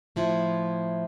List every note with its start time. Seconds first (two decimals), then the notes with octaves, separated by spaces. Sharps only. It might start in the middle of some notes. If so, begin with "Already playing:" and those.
0.16 A2 F3 E4